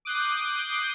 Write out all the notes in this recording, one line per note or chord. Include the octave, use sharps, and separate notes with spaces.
D6 D#6 F#6 G6 C7